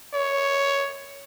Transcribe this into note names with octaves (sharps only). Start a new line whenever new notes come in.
C#5